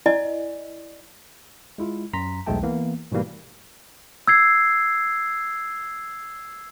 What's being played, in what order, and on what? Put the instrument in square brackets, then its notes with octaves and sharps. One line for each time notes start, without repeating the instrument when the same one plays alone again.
[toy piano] E4 D5 D#5 G#5
[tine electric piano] G#3 E4 F4
F#2 A#5 C6 B6
B1 E2 G#3 A3 G5 A5
E3 A#3 B3
G#2 B2 E3 G3 A#3
[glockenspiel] E6 G#6 C7